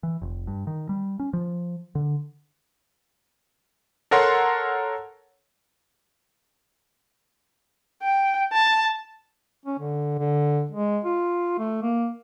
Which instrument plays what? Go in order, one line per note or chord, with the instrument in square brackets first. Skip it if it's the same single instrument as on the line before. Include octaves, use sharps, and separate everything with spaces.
[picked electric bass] E3
F1
G2
D#3
G3
C#4
F3
D3
[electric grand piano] A4 A#4 C#5 F#5 A#5 C6
[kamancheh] G5
A5
[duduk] C#4
D3
D3
G#3
F4
A3
A#3